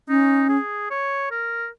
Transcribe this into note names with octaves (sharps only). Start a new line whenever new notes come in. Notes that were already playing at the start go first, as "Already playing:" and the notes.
C#4 D#4
G#4
C#5
A#4